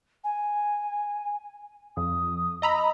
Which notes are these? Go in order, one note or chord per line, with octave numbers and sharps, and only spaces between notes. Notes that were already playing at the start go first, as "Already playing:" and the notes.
G#5
F2 D#6
D#5 A#5 B5 E6